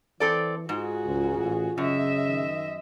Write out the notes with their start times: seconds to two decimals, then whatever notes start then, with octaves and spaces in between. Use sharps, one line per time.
0.20 E3 C4 A4 D5
0.69 G#2 F4 F#4 G#4
1.05 C#2
1.38 A1
1.78 F#2 C#3 D#5 E5
2.26 D#3